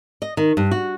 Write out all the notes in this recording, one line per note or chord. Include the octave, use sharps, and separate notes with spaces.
D#5
D#3
G2
F#4